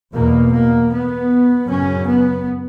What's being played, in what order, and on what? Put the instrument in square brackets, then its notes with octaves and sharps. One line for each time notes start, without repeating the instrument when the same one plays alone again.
[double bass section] E2 B2 A#3
A#3
B3
F#2 C#3 C#4
B3